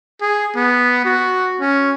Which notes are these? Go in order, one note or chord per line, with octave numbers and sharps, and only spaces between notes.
G#4
B3
F#4
C#4